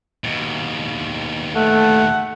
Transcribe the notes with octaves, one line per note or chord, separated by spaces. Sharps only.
D#2 B2
A3 F#5